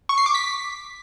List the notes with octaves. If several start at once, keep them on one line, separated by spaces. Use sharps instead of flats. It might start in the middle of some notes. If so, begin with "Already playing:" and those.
C#6
C7
D6
B6